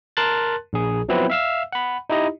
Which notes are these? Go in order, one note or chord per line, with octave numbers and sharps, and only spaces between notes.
A#4 A5 C6 F#6 A6
A#1 G#4
F3 F#3 B3 C4 E4 B4
E5 F5 E6
F#5 B5
D#4 E4 G4 D#5